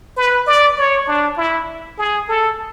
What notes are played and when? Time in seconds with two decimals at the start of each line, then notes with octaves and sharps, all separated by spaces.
0.17 B4
0.47 D5
0.77 C#5
1.07 D4
1.37 E4
1.98 G#4
2.28 A4